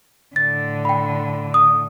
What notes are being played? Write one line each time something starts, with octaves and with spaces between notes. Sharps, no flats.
A2 D3 A6
G5 B5
D#6